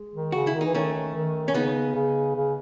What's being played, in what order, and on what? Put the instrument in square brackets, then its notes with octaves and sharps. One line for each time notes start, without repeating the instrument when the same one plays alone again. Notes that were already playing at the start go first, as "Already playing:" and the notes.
Already playing: [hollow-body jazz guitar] G#3
[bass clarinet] D#3
[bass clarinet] C#3 [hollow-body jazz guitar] F#4
[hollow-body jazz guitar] E4
[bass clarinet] D#3
[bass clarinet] E3 [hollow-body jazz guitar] D#4
[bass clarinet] D#3 [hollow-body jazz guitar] A3 C#4
[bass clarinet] D#3
[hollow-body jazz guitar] C#4
[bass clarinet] C#3 [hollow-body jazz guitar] B3 D#4
[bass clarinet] C#3
C#3